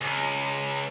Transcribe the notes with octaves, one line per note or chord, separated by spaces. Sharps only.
C#2